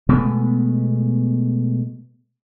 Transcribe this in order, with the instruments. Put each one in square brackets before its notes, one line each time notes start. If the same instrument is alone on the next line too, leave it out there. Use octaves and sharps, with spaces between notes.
[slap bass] B2 G#3 A3 B3